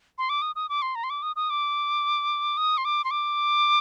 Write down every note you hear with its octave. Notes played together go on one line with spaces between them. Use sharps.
C6
D6
D#6
D#6
D6
C6
A#5
C6
D6
D#6
D#6
D6
D#6
C6
D6
C6
D6